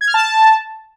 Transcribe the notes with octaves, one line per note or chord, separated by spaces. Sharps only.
G#6
F6
A5